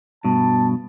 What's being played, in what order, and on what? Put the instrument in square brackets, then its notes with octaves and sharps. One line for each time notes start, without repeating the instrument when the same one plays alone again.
[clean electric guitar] G2 B2 [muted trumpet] A5